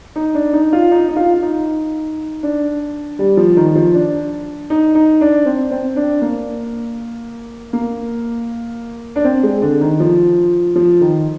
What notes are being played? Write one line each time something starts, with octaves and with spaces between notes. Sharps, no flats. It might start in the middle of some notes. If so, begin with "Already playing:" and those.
D#4
D4
D#4
F4
D#4
D#4
F4
F4
D#4
D4
G3
F3
D#3
F3
D4
D#4
D#4
D4
C4
C4
D4
A#3
A#3
D4
C4
G#3
D3
D#3
F3
F3
D#3